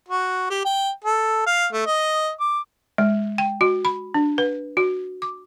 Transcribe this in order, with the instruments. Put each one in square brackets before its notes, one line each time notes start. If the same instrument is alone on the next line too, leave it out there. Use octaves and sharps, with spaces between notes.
[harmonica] F#4
G4
G5
A4
F5
A3
D#5
D6
[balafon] G#3
G5
F#4
B5
D4
B4
F#4
D6